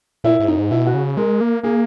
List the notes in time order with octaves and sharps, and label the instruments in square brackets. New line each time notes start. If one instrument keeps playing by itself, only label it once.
[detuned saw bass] A#2 [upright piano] E4
[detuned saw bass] G#2
[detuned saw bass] F#2 [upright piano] D#4
[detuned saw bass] G#2
[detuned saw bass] B2 [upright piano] E4
[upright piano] F#4
[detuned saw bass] C#3
[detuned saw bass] G#3 [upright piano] A#4
[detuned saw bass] A#3
[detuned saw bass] A#3 [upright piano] G#4